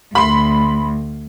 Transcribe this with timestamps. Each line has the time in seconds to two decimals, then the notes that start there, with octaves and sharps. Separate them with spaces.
0.15 D2 B5 C6